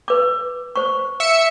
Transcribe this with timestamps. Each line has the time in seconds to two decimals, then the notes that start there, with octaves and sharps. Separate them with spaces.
0.08 B4 D6
0.76 C5 C#6
1.20 E5 C#7